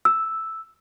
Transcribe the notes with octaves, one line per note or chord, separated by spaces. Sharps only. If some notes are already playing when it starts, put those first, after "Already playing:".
E6